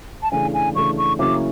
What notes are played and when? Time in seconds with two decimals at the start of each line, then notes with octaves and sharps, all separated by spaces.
0.23 A5
0.32 C#3 E3 A3 D4 G#5
0.54 G#5
0.75 C#3 E3 A3 D4 C#6
0.98 C#6
1.19 C#3 F#3 A#3 C#4 E4 D6